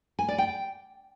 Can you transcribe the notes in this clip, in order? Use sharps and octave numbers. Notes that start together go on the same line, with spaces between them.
G#5
D5
G5